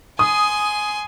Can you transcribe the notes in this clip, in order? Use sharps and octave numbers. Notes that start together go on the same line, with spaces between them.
G#5 C6 D#6